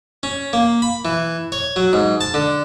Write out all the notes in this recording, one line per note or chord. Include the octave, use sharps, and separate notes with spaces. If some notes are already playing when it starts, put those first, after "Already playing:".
C#4
A#3
B5
E3
C#5
F#3
G#2
A5
D3